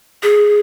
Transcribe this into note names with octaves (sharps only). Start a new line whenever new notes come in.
G#4